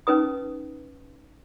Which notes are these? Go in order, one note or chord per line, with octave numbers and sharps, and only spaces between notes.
C#4 D#4 B4 D#6